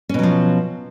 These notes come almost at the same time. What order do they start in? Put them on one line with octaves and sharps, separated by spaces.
C#4 B2 F#3 F3